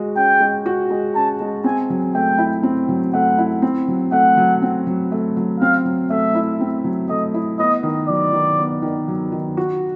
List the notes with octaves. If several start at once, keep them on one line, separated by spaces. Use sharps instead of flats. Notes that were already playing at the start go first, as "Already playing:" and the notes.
Already playing: G#3 F#4
C#4 G5
G#3
F#4
G#3
C#4 A5
G#3
C4 G#5
F#3
A3 G5
E4
C4
F#3
A3 F#5
E4
C4
F#3
A3 F#5
F#3
C4
F#3
A3
F#3
C4 F5
F#3
A3 E5
E4
C4
F#3
A3 D#5
E4
B3 D#5
D#3
F#3 D5
D#3
B3
D#3
F#3
D#3
F#4